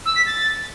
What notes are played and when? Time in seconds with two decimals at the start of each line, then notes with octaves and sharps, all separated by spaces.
0.06 E6
0.16 B6
0.26 A6